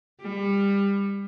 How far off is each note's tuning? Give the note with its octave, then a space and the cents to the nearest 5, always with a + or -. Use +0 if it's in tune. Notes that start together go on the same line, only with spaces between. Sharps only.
G3 +25